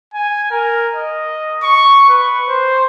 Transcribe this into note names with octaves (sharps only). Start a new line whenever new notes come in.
G#5
A#4
D#5
C#6
B4
C5